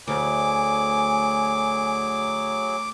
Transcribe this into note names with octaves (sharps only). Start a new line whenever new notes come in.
D2 F#3 G#4 G#5 D6